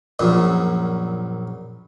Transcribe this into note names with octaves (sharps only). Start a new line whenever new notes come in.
A#1 F#2 A#2